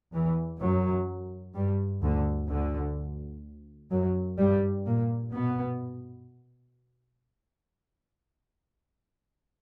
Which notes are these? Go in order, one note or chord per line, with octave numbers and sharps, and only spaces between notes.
E2 E3
F#2 F#3
G2 G3
D2 D3
D2 D3
F#2 F#3
G2 G3
A#2 A#3
B2 B3